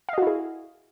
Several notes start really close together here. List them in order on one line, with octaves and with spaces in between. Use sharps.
F5 D#5 F#4 E4 G#4